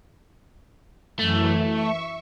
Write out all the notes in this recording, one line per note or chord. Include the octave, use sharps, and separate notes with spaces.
F#2 E3 A3
E5 C#6